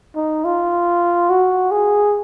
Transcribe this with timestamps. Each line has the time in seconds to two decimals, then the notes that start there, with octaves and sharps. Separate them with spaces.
0.16 D#4
0.44 F4
1.30 F#4
1.71 G#4